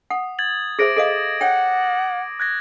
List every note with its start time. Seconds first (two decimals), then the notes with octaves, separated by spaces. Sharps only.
0.10 F#5 D#6
0.39 G#6 A6 F#7
0.79 G#4 C5 E5 D6 A#6 D7
0.97 A4 D#5 F5
1.41 C#5 F#5 G5 D7
2.40 F#6 G#6 A#6